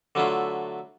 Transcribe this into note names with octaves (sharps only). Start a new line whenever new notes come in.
D3 F#3 A3 E4 F4